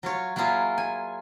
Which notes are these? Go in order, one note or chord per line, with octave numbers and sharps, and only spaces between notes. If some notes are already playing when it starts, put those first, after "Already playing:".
F#3 F4 C#5
F#3 A#3 E4 F4 G#4
G#5